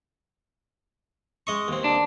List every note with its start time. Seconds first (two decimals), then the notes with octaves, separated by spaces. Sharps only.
1.47 G#3 D#5 C#6
1.68 D#2 C4
1.84 D4